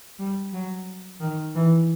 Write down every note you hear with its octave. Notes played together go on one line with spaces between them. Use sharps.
G3
F#3
D#3
E3